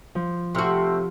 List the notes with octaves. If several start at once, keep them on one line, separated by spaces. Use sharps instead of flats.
F3
C3 A3 C4 F#4 C6 F6